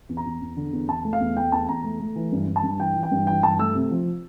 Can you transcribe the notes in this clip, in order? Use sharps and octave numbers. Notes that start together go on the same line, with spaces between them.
E2
A#5
E2
E2
D3
E2
E2 A5
A3
F5
E2
A3 G5
E2 A5
E2 A#5
A3
A3
E3
G2
G2
A5
G2
E3 G5
E3
G5
G2
E3 G5
G2 A5
A3 E6
C3
F3